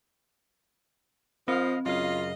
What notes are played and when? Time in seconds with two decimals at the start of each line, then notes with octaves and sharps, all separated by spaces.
1.48 F3 C4 D#5 F5 F6
1.86 F#2 C#3 F4 D#5 F5